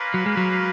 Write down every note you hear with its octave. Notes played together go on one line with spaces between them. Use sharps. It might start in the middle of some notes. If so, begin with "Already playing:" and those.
Already playing: A#3 C#4 F4 B4
F#3
G#3
F#3